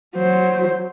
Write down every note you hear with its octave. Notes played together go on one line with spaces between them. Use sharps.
F#3 C5